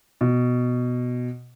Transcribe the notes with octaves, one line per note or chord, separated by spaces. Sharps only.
B2